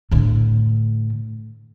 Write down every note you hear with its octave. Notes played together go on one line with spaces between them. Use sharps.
A2 D3